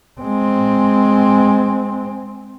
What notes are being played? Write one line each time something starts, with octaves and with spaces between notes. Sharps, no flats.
G#3 C4